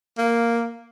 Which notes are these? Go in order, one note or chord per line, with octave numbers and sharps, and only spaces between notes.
A#3